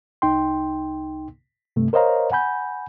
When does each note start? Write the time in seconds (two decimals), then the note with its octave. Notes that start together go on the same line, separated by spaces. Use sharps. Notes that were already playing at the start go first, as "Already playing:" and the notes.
0.22 C2 D#4 G5 C6
1.76 G2 C3 A3
1.93 A#4 C5 C#5 D#5 F5 A#5
2.32 F#5 G#5 B5 G6